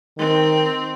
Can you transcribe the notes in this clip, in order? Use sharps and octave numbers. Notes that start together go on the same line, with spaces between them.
D#3 C4